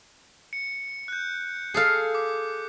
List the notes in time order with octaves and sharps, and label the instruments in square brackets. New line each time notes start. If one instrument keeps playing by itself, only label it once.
[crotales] C#7
F#6 G6
[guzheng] G#4 A4 F5
[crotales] D6